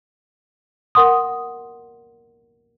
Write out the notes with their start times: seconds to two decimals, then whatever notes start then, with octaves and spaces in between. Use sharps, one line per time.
0.95 A#4 F#5 C6 D#6